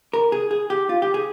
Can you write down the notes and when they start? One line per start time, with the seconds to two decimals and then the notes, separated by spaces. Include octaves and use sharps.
0.13 A#4
0.32 G#4
0.51 G#4
0.70 G4
0.89 F4
1.02 G4
1.14 G#4